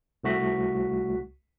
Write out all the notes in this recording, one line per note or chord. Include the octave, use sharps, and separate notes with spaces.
C2 A3 F#4 B6